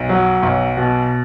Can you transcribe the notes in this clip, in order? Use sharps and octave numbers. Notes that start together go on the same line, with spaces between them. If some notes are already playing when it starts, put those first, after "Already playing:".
Already playing: B1
F#3
B1
B2